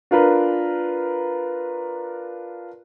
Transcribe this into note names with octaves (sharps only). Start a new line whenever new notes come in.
D4 F4 A#4 B4